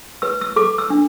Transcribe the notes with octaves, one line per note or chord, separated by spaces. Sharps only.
B4 E6
E6
A4 D6
E6
D4